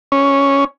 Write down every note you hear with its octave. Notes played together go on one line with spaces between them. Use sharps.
C#4